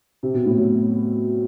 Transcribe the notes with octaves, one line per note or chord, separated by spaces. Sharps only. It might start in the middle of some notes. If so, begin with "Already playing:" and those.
C3
B2
A2
F#3